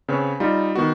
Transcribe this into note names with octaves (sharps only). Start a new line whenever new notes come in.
C#3 C4 B4 C#5
G3 D#4 F4
D#3 B3 F#4